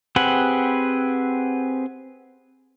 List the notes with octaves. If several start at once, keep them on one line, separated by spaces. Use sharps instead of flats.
C4 G4 G#4 B4 F#5